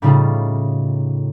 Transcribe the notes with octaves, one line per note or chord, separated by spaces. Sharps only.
A2 C#3 G3 C#4 D#4 F4